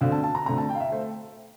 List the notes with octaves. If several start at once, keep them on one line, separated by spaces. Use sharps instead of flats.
D2 D3 A3 C4 F5
A5
A5
A#5
D2 D3 A3 C4 A#5
A5
G5
F5
E5
A3 C5